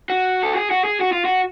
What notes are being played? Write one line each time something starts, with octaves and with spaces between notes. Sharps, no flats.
F#4
A4
G#4
F#4
G#4
F#4
F4
F#4